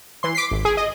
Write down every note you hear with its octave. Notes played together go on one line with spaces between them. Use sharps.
E3 C6
D6 B6 C7
G#1
G#4
D#5